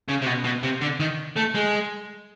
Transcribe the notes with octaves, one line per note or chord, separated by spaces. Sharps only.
C#3
C3
B2
B2
C3
D3
D#3
A3
G#3